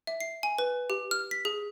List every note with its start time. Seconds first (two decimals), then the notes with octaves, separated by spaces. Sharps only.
0.07 E5
0.21 C7
0.43 G#5
0.58 B4
0.90 G4
1.11 F6
1.31 B6
1.45 G#4